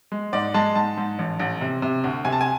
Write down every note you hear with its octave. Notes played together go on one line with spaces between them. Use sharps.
G#3
G#2 D5
G#3 A5
G#2 A5
G#2
A1
A1
C3
C3
D2
C3 G#5
A5
G#5